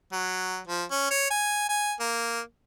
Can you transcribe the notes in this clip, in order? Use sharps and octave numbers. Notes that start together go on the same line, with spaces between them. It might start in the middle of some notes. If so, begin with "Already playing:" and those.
F#3
F3
C#4
C#5
G#5
G#5
A#3